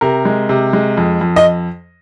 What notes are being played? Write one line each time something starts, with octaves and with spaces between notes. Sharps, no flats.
C3 A#4
G#3
C3
G#3
F2
F2
D#5